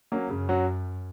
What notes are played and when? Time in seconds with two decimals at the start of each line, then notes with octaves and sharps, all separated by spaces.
0.12 F#3 A#3 C#4
0.30 F#2 C#3
0.49 F#3 C#4 F#4